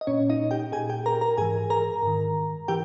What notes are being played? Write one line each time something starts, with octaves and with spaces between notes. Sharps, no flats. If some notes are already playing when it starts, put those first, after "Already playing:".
D#5
A#2 C#4 C#5
D#4 D#5
G4 G5
A#2 G#4 G#5
G4 G5
A#4 A#5
A#4 A#5
G#2 E3 G#4 G#5
A#4 A#5
G#2 D#3
E3 G4 G5